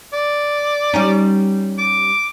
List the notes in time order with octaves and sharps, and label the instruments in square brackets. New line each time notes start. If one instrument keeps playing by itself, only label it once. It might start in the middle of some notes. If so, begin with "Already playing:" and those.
[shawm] D5
[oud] G3 C#4 D#4
[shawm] D6